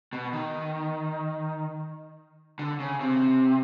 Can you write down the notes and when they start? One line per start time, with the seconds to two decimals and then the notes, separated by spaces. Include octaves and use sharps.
0.13 B2
0.33 D#3
2.59 D3
2.80 C#3
3.01 C3